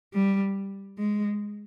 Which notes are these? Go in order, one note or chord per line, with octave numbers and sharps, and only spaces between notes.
G3
G#3